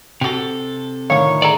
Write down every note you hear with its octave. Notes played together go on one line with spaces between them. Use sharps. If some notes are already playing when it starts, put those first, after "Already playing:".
C3 F#4 G4 A4
A2 D3 D#3 F4 C#5 F5
G#4 A4 C#5 D5 A#5